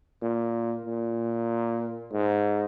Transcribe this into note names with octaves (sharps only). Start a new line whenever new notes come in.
A#2
A#2
G#2